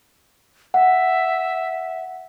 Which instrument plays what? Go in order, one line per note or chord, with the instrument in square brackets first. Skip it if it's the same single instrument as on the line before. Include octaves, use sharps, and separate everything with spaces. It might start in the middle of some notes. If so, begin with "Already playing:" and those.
[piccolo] E5 [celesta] F#5